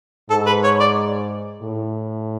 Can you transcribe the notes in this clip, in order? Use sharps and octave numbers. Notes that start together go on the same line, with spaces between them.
G#2 A4
B4
C#5
D5
A2